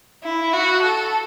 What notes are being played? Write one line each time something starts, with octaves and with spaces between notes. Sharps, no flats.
E4
F#4
A4